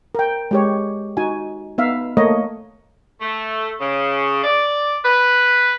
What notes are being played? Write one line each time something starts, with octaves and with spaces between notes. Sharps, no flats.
A#4 G5
G#3 G4 C#5
D#4 F#4 G#5
B3 D#4 E5 F5
A3 A#3 A#4 C#5 D#5
A3
C#3
D5
B4